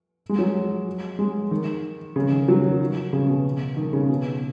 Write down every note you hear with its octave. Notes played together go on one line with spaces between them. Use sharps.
G#3
F#3
G#3
D#3
C#3
D#3
F#3
D#3
C#3
B2
D#3
C#3
B2